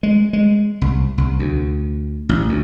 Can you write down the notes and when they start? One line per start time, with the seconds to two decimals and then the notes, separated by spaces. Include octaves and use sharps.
0.03 G#3
0.33 G#3
0.81 C2
1.18 C2
1.39 D2
2.29 A1
2.49 D2